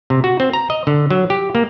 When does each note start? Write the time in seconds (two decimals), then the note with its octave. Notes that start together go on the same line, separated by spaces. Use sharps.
0.10 C3
0.24 F#4
0.40 C4
0.53 A#5
0.70 D#5
0.87 D3
1.10 F#3
1.30 G4
1.55 A#3